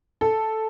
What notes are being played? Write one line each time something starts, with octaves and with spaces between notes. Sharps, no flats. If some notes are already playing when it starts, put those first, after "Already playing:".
A4